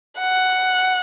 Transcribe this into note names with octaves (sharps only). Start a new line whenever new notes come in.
F#5